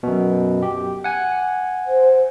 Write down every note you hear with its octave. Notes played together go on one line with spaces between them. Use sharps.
F#2 B2
G4
F#5 G#5
C5